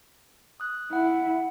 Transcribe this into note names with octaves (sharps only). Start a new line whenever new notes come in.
D#6 F#6
E4 F#5